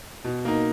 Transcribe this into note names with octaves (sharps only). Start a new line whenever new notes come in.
B2
A#3 D#4